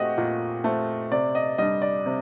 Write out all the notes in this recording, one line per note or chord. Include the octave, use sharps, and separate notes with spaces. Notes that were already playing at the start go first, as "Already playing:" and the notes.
Already playing: A#2 A3 C4 F#4 G4 D#5 F#5
A#2
A3 C4
C3 D5
D#5
G3 D4 D#5
D5
C3